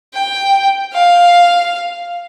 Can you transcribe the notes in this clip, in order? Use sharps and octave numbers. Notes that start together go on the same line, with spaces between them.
G5
F5